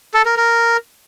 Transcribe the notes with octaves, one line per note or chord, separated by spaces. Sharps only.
A4
A#4
A#4